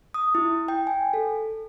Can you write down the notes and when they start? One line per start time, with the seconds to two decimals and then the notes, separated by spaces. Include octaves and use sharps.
0.14 D#6
0.35 E4
0.68 G5
0.87 G#5
1.13 A4